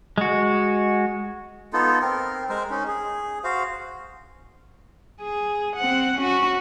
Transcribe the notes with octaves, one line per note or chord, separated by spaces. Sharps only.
G#3 F#4
B3 D#4 F4 A4
C4 A#4
G#3 A#4 C5
C#4 D#4
G#4
F#4 C5 F5
G#4
C4 F#5
C#4 F#4